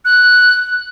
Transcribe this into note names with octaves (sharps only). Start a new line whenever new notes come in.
F#6